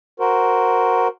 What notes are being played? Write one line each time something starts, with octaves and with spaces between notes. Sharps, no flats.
F#4 A#4 C5